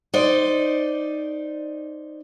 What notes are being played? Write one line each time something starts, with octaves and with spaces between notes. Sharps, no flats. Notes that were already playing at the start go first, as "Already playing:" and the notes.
D#4 C5 D5